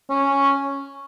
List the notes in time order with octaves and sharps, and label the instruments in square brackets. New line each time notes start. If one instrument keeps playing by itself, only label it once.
[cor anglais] C#4